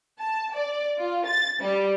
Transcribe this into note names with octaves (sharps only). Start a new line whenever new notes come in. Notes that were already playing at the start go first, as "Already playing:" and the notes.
A5
D5
F4
A6
G3